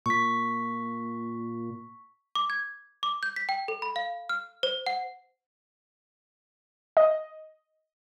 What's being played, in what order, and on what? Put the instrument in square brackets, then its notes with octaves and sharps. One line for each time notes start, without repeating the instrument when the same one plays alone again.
[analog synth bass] A#2 [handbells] C#6 B6
[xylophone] D6
G#6
D6
G6
B6
G5
A4
B5
F5
F6
C5
F#5
[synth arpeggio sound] D#5